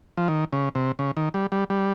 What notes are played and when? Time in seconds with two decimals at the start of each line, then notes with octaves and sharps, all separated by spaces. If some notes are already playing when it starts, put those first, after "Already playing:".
0.17 F3
0.28 D#3
0.53 C#3
0.75 C3
0.99 C#3
1.17 D#3
1.34 G3
1.52 G3
1.70 G3